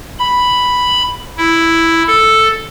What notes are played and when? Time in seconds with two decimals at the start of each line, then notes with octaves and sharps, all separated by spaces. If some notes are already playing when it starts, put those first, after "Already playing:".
0.19 B5
1.37 E4
2.07 A4